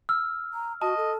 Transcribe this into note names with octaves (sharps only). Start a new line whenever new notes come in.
E6 F6
A#5
F#4 D#5 A5
A4